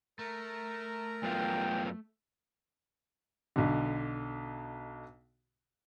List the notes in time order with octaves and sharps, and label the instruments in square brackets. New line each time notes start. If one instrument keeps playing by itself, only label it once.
[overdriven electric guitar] A3 [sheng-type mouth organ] A#4 A#5
[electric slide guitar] F#2 B3 F4 [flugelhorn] G5
[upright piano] B1 B2 D3